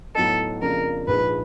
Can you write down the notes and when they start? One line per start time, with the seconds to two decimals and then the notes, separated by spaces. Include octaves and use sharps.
0.15 A2 F#3 B3 D#4 A4
0.61 F2 C#3 F3 A#3 D4 A#4
1.07 A#1 G#2 F3 B4